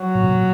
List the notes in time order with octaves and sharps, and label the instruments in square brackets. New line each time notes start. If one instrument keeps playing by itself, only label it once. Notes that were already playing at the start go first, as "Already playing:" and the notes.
Already playing: [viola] F#3
[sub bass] A#2
B2
A#2